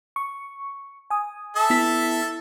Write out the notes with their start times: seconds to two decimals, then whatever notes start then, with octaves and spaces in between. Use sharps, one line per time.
0.16 C#6
1.10 G#5 D#6
1.56 A4 E5 A5
1.70 B3 E4 B6